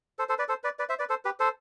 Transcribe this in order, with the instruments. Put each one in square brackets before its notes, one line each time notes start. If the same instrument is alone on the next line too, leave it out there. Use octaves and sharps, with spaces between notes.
[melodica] A4 C5
A4 C5
B4 D5
A4 C5
B4 D5
B4 D5
C5 E5
B4 D5
A4 C5
G4 B4
A4 C5